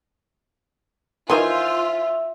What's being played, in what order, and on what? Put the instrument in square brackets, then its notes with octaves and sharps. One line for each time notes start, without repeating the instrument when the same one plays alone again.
[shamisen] D#3 E3 D#5 [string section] F4 [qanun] C5 G#5 C6 [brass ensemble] E5